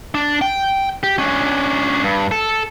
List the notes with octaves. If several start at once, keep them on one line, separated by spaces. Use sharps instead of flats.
D4
G5
G4
C#4 D4
G2
A4